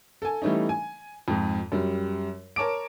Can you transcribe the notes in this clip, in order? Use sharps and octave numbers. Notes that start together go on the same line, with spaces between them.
A4 G#5
E3 G3 A3 C#4 D#4
G#5
F2 G#2
F#2 G3
A#4 C#5 A5 D6 D7